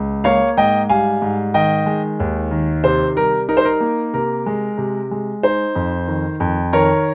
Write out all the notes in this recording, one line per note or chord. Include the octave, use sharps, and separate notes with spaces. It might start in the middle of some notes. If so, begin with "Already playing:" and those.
Already playing: C#2
A#3 C#5 F5
G#2 D#5 G5
G3 F5 G#5
G#2
D#3 D#5 G5
G#3
D#2
D#3
C3 C5
G3 A#4
D#4 A#4
C5
A#4
A#3
C3 A#4
G#3
C3
G#3
D#4 C5
F2
D#3
F2
D#3 A#4 C#5